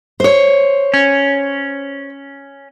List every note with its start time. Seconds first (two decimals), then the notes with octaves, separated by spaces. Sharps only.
0.20 C5 C#5
0.94 C#4